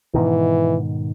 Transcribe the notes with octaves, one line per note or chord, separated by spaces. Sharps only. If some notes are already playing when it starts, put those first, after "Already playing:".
G#2 B2 D#3 E3